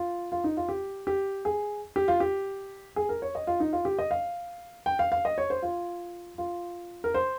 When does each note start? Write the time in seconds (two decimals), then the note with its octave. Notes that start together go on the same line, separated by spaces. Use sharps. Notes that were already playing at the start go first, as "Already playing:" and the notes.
Already playing: F4
0.32 F4
0.44 D#4
0.57 F4
0.69 G4
1.07 G4
1.45 G#4
1.96 G4
2.08 F4
2.20 G4
2.96 G#4
3.09 A#4
3.22 C#5
3.35 D#5
3.47 F4
3.60 D#4
3.73 F4
3.85 G4
3.99 D#5
4.11 F5
4.86 G5
4.99 F5
5.12 F5
5.25 D#5
5.38 C#5
5.50 C5
5.62 F4
6.38 F4
7.04 A#4
7.14 C5